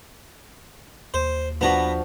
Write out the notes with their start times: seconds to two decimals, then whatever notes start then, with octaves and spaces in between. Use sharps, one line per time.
1.14 D#2 C5
1.61 F3 B3 D4 F#4 A#5